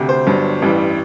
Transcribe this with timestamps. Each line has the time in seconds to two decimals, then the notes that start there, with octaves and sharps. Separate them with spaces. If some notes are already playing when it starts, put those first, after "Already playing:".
Already playing: D2 C3
0.09 C5
0.27 G1 G2 F#3
0.62 A1 G2 E3 G3